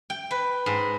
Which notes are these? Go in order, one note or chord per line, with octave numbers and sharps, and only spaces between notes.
G5
B4
G#2